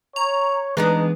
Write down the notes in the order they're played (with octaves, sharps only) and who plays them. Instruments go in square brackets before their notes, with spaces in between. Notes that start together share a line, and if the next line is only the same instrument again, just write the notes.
[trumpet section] C#5 [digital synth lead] A#5
[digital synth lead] E3 [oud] G#3 B3 D4 [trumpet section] D#4